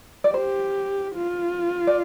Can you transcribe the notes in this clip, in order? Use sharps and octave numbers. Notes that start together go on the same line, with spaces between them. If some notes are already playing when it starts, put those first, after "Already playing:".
D5
G4 C5
F4
D5